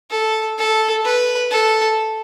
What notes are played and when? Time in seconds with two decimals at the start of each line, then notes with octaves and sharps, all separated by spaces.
0.11 A4
0.58 A4
1.05 B4
1.51 A4